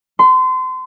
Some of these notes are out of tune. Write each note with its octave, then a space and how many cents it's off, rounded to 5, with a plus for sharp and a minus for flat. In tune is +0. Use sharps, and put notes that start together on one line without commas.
C6 -30